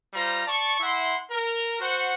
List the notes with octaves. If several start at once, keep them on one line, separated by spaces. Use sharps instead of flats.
G3 F4 C5 A#5
D5 A5 C#6
E4 E5 F#5 C6
A#4
F#4 C5 F#5